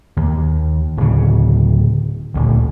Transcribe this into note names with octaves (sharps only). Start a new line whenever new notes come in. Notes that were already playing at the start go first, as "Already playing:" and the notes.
D#2
D1 C#3
D#1 D2